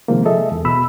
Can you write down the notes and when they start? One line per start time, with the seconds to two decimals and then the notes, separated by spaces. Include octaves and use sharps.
0.08 C3 D#3 F3 G#3 A#3
0.25 G#4 A4 D#5 E5
0.52 E2
0.65 B2 B5 E6